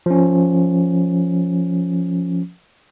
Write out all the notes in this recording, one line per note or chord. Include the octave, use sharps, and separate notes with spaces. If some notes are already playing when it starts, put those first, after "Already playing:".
F3 C#4